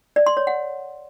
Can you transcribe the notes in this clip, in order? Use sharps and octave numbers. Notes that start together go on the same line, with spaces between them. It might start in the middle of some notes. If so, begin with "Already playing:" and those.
D5
C6
C#5
F#5